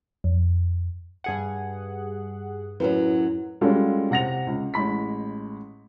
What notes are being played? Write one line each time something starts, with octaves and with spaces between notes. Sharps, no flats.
F2
G2 G#4 F#5
F#2 A2 F#3 E4 B4
G3 G#3 C#4 F4 F#4 A4
C3 F#5 A#6 F7
C#2
A1 G#3 B5 B6